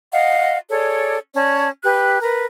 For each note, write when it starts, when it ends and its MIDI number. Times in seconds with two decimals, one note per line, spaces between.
0.12 0.57 75
0.12 0.57 77
0.12 0.57 78
0.70 1.17 68
0.70 1.17 69
0.70 1.17 73
0.70 1.17 74
1.33 1.68 61
1.33 1.68 73
1.33 1.68 74
1.33 1.68 81
1.83 2.19 67
1.83 2.19 71
1.83 2.19 90
2.22 2.45 70
2.22 2.45 71